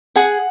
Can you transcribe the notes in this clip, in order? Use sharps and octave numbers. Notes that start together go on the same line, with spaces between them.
G#4 F#5